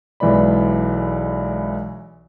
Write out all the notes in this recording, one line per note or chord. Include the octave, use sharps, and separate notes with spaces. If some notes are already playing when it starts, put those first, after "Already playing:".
B1 E3 G#3 D5 B5